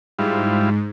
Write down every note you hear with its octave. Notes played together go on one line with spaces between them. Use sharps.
G#2 G3 E4 F4